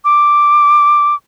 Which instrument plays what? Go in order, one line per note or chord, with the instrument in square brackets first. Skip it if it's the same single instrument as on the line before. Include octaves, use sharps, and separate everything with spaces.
[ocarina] D6